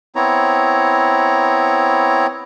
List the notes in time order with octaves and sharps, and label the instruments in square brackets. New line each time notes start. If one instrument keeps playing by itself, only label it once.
[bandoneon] B3 C4 E4 C#5 A#5